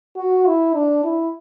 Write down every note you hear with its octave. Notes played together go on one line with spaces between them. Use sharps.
F#4
E4
D4
E4